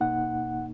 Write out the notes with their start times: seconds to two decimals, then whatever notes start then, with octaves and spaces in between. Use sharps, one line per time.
0.01 B2 A#3 D#4 F#5